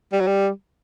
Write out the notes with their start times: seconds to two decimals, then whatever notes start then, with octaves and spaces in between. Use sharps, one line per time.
0.13 G3
0.20 F#3
0.27 G3